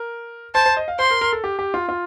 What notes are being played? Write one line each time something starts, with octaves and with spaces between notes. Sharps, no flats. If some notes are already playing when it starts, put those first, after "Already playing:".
Already playing: A#4
C5 A5
C5
D#5
F5
C5 C6
A#4
A#4
A4
G4
G4
F4
F4